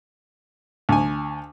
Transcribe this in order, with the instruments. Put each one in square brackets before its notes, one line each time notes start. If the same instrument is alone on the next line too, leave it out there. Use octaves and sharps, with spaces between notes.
[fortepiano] D2 G#5